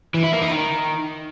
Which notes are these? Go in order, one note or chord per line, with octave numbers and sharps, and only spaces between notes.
E3
E4
A#3
D#4
D#3